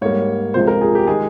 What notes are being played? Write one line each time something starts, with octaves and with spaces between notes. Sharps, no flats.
G#2 G3 A#3 C#5
C#2 C3 F3 G#3 C5
A#4
G#4
G4
D#3 G#3 G#4